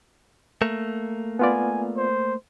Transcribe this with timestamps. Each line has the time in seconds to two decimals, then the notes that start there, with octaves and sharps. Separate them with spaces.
0.62 A3 A#3
1.39 B3 F4 D5 G#5
1.97 C5